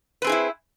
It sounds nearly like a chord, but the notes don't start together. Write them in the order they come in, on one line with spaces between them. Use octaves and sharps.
B4 C4 G#4 D#4 E4